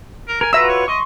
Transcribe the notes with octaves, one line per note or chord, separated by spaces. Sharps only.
A#4
A#4 G#5
F4 F#4 B4 E5 A#5 E6
C#5
D#5 C6 C#6